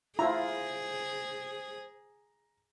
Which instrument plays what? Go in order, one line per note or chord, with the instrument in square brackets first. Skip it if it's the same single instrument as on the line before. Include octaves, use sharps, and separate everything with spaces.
[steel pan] E4 F4 [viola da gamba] G#4 [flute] C5 [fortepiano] A#5